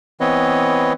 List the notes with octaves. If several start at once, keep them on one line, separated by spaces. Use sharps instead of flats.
E3 B3 C4 B4 C#5 D#5